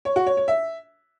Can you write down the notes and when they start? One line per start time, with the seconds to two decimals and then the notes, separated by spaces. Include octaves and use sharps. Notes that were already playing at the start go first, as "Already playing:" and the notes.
0.05 C#5
0.16 F#4
0.27 C#5
0.37 C#5
0.48 E5